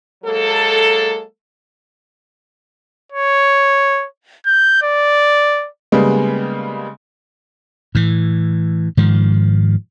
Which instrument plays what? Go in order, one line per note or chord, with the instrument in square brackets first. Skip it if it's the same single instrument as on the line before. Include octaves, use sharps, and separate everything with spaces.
[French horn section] F#3 G#3 A#3 A4
[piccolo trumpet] C#5
G6
D5
[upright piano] C#3 G3 G#3 A#3 B3
[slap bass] A2 E3
G#2 D#3 F3